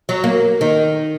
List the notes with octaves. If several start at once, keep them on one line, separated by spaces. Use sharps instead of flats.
F#3
A#3
D#3